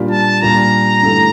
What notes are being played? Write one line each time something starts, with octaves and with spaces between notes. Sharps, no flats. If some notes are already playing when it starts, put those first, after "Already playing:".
Already playing: A#2 G3 A#3 D4 F4
A5
A#2 G3 A#3 D4 F4 A#5
G2 D3 A3 E4 G4